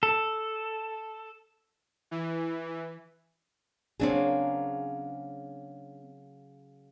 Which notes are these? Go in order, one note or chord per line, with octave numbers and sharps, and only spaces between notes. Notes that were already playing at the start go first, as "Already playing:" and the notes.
A4
E3
C#3 F#3 A#3 C4 D4 G#4